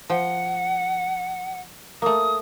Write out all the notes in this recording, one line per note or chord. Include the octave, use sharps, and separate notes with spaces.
F3 F#5 G5
A3 A#3 D#6